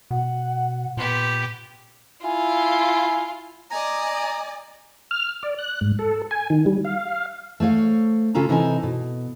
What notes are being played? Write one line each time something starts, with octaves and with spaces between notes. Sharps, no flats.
B2 F#5
A#2 B3 G4 C6
E4 F4 G#5
D5 D#5 G#5 A#5
F6
D5
F#6
G#2
A4
G#5
D#3
G3
F5
A3 C5 C#5 F5
C#3 C#4 F4 A4 A#5
C3 E3 D#4 A4 F5 G#5
B2